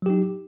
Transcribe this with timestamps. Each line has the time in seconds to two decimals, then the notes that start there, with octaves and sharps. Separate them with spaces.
0.02 F#3
0.06 G4
0.10 D#4